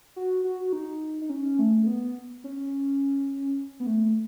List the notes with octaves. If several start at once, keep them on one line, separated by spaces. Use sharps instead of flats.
F#4
F#4
D#4
D#4
C#4
A3
A3
B3
C#4
B3
A3